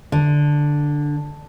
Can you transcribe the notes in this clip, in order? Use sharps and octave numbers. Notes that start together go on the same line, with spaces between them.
D3